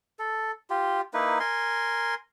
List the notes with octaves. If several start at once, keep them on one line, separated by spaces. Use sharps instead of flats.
A4
F4 G4
A#3 D#4 E4 B4
A#4 G#5 C6